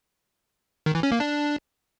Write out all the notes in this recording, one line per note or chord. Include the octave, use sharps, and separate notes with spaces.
D#3
E3
C#4
A#3
D4